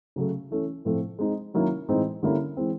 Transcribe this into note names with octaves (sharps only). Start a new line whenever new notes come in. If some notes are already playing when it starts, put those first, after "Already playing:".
C#3 F#3 A3
E3 A3 C#4
A2 F3 A3 C4
G#3 C4 D#4
D#3 F#3 A#3 C#4 E4
A2 E3 G#3 C4 D#4
D3 G3 A#3 C#4 E4
E3 G#3 C4